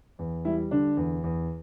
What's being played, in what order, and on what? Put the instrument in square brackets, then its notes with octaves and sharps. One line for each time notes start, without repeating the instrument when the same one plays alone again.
[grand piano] E2
G3 E4
D3 D4
E2
E2